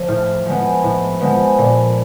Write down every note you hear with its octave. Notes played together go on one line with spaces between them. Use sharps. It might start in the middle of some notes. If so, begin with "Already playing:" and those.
Already playing: F3
A2 F6
F3 G#3 B3
A2
F3 G#3 B3
A#2